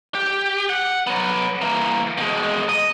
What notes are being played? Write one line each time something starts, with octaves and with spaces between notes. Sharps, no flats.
G4
F#5
F#3 B3
E3 A#3
B2 G#3
D#5